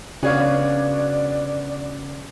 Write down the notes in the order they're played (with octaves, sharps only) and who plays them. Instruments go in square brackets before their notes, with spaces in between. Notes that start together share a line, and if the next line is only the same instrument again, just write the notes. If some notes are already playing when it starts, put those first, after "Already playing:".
[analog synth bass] C#3 [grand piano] B3 D4 F#4 [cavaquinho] G#4 C#5 F5 [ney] D5